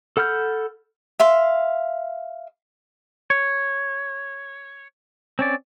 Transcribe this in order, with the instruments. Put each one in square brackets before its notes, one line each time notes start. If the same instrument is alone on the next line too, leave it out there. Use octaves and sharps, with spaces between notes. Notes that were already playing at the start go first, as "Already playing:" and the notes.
[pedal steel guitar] A4 F#5 B5 F6 G6
[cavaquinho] E5 F5 C6
[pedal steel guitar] C#5
C4 C#4 D5